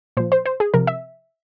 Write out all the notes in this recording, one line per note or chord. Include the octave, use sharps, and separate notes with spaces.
A#2 F3 C5
C5
C5
G#4
C3 F3 A#4
E5